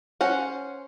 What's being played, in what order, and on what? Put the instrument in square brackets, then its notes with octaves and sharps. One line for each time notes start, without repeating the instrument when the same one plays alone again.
[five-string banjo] C#4 C5 F#5